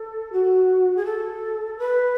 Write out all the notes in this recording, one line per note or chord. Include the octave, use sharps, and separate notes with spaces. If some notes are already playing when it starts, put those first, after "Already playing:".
Already playing: A4
F#4
G#4
A4
B4